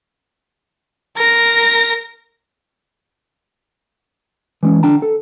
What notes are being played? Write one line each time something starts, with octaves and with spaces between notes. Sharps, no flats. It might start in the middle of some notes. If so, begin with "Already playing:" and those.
A#4 A#6
E3 G#3 C4 C#4
D3 D4 G5 A5 A#5
A4